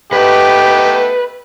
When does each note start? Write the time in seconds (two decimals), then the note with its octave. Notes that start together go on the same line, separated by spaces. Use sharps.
0.13 A3 B3 D#4 G4 B4